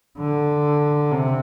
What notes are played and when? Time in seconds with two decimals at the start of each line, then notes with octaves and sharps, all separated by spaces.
0.18 D3
1.11 C3